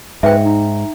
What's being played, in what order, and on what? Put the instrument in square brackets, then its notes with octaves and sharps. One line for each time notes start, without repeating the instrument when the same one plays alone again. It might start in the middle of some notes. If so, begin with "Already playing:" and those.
[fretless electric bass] G#2 [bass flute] B4 [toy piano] E5 G5
[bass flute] D#4